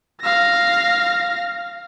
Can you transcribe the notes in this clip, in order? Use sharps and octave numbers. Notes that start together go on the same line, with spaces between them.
F5 A#6